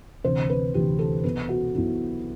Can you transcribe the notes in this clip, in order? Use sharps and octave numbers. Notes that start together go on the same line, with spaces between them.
D2 C3 E3 C5
B4
D2 C3 E3 G4
A4
B1 B2 B4
F#4
B1 B2 E4